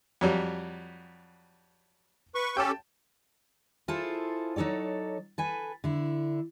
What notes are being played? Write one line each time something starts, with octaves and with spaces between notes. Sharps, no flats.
F2 F#3 G3
B4 C#6
C#4 G4 A4 G5 A5
E4 F4 G#4 A4 C5
F#3 D#4 A4 C#5 D5
A4 B4 G#5
D3 E4